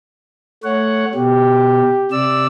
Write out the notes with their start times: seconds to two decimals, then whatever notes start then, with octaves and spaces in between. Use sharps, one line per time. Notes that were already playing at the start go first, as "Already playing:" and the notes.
0.63 A3 C#5 F#5
1.15 B2 G4
2.11 C3 D5 E6